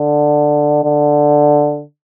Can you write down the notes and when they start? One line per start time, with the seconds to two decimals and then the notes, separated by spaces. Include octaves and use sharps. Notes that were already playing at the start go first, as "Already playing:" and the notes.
Already playing: D3
0.84 D3